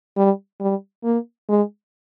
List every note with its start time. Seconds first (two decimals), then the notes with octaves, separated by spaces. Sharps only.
0.17 G3
0.60 G3
1.04 A#3
1.49 G#3